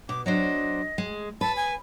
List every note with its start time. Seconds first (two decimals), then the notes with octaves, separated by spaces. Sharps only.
0.09 B2 D6
0.26 F#3 D4 C5 D#5
0.98 G#3
1.41 B4 A5
1.56 G#5